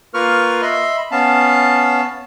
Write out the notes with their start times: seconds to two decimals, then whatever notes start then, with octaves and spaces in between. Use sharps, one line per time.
0.14 A#3 F4 A#4 B4 C#6 F6
0.62 D#5 E5 B5 C6
1.11 B3 C#4 F5 A5